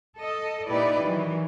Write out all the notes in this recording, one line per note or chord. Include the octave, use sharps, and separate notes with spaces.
A4 D#5
A#2 D#4 E4 G4 B4 D5
D#3 E3 F#3